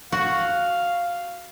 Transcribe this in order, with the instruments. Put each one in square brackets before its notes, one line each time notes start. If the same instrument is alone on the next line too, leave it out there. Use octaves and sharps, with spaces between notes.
[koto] F#4 [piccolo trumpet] F5